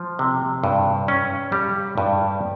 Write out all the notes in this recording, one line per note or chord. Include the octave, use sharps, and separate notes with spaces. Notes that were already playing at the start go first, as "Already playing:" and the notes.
Already playing: F3
C3
G2
C#4
G3
G2